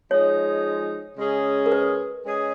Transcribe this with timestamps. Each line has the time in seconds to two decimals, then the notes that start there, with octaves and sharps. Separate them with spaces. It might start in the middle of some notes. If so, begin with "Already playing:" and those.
0.10 F3 G#3 D#4 G#4 C#5
1.18 C#3 G#3 C#4 G#4
1.66 A#4
1.72 B4
2.25 G#3 C#4 G#4